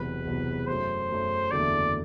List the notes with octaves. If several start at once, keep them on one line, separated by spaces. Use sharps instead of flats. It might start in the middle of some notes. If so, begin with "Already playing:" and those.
Already playing: E1 E2 C3 F#3 B4
E1 E2 C3 F#3
F#2 F#3 A3 C5
F#2 F#3 A3
F#1 E2 D3 F#3 A3 D5